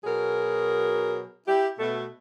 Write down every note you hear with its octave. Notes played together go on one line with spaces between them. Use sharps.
B2 F#3 G#4 A#4
E4 G4
B2 A3